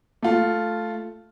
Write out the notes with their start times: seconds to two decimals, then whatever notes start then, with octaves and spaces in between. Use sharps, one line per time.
0.22 A3 F4